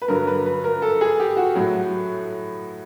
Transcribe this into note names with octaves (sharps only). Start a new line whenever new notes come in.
B4
G2 D3 F#3 A#4
B4
B4
A#4
A4
G#4
G4
F#4
A2 F#3